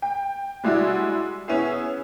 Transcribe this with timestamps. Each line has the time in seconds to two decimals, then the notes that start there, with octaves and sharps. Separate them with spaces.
0.02 G5
0.64 G3 G#3 D4 E4 F#4
1.48 B3 C#4 E4 G#4